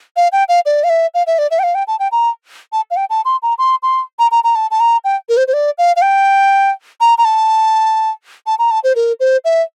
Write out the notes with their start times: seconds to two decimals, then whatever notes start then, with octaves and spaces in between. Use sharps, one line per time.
0.17 F5
0.32 G5
0.49 F5
0.66 D5
0.84 F5
0.90 E5
1.14 F5
1.27 E5
1.38 D5
1.51 E5
1.59 G5
1.63 F5
1.75 G5
1.87 A5
1.99 G5
2.12 A#5
2.73 A5
2.91 F5
2.96 G5
3.10 A5
3.25 C6
3.42 A#5
3.58 C6
3.83 C6
4.19 A#5
4.31 A#5
4.44 A#5
4.55 A5
4.71 A5
4.80 A#5
5.04 G5
5.29 A#4
5.37 C5
5.48 C5
5.53 D5
5.78 F5
5.96 F5
6.02 G5
7.01 A#5
7.18 A#5
7.25 A5
8.47 A5
8.59 A#5
8.71 A5
8.84 C5
8.96 A#4
9.20 C5
9.45 E5